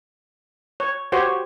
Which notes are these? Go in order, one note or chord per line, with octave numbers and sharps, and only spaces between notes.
C#5
F#4 G4 C5 C#5